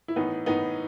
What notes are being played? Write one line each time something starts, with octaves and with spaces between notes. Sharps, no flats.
E4
A2 E3 B3 D#4
A2 E3 B3 D#4